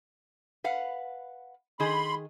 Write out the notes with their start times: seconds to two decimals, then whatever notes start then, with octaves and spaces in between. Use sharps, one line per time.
0.64 B4 F5 F#5
1.80 D#3 G#4 B5 C6